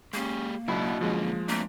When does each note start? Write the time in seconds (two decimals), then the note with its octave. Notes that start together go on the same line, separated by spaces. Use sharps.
0.13 G#3 A#3 C#4 G4
0.68 C#2 B2 F#3 D4 E4 B5
1.01 F#2 D3 F3 G#3 C#4
1.48 A3 A#3 C4 D4